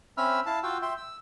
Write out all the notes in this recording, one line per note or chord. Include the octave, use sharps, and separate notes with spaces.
C4 C#4 E5 B5 E6 F6
E4 F5 A5
F4 F#4 F5 G5 E6
E5 G5 C6
E6